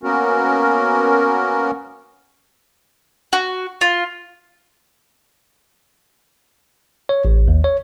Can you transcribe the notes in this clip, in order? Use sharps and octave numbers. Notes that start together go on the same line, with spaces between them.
A#3 B3 C#4 F#4 A#4
F#4
F4
C#5
A1
D#2
C#5